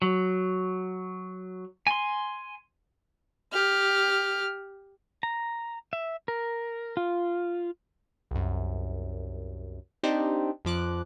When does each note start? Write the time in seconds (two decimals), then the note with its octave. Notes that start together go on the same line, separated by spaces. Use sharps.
0.02 F#3
1.87 G#5 C6
3.53 G4 F6
5.23 A#5
5.93 E5
6.28 A#4
6.97 F4
8.31 C2 F#2
10.03 C4 D4 D#4 G4 C5
10.65 F2 F3 D6 F#6